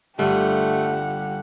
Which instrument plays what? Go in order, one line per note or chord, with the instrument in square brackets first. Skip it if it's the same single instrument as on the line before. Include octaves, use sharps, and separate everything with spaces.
[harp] G1 [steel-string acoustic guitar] G3 F4 [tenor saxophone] A3 [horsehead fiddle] G4 F#5